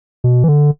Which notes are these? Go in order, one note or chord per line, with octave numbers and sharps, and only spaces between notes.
B2
E3
D3